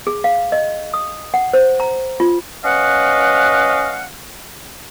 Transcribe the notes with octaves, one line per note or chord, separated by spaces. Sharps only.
G#4
F5
D#5
D#6
F#5
C5
A#5
F4
C#4 B4 D#5 F5 F#5